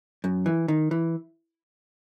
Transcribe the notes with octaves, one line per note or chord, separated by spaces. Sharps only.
F#2
E3
D#3
E3